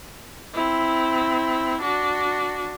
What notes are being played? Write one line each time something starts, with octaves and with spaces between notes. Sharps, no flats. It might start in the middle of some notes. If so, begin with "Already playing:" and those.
C4 E4
D4 F#4